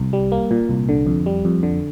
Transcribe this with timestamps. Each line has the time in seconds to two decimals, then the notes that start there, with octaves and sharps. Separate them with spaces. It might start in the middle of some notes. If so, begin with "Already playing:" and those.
Already playing: C2
0.13 G3
0.32 A#3
0.51 A#2
0.69 C2
0.89 D3
1.07 F2
1.26 G3
1.45 F2
1.63 D3